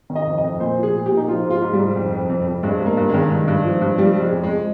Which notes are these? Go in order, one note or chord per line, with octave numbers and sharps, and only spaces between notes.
D#3
D#5
F2
D#5
F2
A#2 C5
F3
G#4
A#2
G4
A#2
D#4
F3 F4
G#2
F4
G#2
G3
G#2
F2
F2
F2
F2
G2 G#3
G2
A#3
G2
G#3
D#3
G2
G2
F3
G2
F3 G3
F3
G#3
F2
G#3